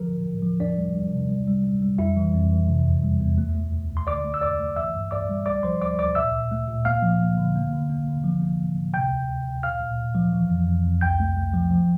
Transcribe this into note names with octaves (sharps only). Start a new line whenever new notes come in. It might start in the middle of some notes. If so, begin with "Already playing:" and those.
Already playing: D3 F3 A#4
A2
A2
F3
E2 D4 D5
G3
G3
C3
G3
G3
G3
G3
F2 E4 E5
E3
F2
E3
C3
E2
G3
E2
A3
A3
D2
D2
C6
D3 D5 D6
A3
E6
E2 D5 D6
A3
E3 E5 E6
G2
G2 D5 D6
G3
D2 D5 D6
F3 C5 C6
D2 D5 D6
D2 D5 D6
A#2 E5 E6
A#2
A3
A#2
A#3 F5 F6
F3
A#3
D3
A#3
D3
A#3
D3
F3
A#3
A2
A2
C3 G5 G6
D2
D2
D2
A#2 F5 F6
A#2
A#2
F3
E3
F2
F2
F2
C2 G5 G6
A3
A3
F3
F3